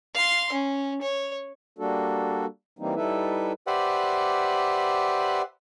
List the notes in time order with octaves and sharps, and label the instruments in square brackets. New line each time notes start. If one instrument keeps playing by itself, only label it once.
[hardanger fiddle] F5 C6
C#4
C#5
[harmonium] G3 A#3 D4 F#4 A4
E3 G3 A#3 C4 D#4
G3 D#4 E4 A4 B4 E5
[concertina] G4 B4 C5 D5 E5 F#5